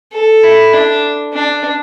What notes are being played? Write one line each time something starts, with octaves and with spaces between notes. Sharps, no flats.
A4
E4
D4
D4